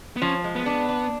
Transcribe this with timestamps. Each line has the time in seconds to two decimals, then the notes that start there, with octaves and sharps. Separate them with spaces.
0.16 B3
0.22 F3 C#4
0.44 G#3
0.55 B3
0.66 D4
0.89 D4